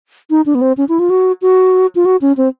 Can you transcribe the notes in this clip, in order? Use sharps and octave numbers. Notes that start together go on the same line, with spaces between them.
D#4
D4
B3
C4
C#4
E4
F4
F#4
F#4
F4
F#4
C#4
C4